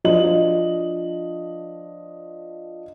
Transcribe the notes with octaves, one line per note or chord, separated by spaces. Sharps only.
F3 D4 D#5 F#7